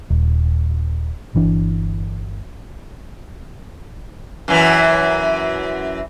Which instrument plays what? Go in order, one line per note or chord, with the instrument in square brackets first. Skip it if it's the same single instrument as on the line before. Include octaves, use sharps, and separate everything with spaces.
[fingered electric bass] D#1
G1 E3 D4
[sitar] F#2 E3